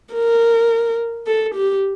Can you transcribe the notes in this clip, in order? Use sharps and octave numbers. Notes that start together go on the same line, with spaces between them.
A#4
A4
G4